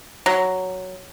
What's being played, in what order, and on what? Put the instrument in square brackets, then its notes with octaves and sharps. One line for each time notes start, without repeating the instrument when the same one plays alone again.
[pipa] F#3